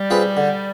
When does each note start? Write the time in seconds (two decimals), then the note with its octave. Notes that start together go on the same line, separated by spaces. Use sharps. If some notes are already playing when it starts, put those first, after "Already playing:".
Already playing: G3
0.10 C4 F4 G#4 B4
0.37 D3